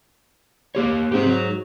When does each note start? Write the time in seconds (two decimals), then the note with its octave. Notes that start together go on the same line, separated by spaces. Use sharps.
0.75 A#3 G4 C#5
1.12 G#2 C4 G4
1.26 F#3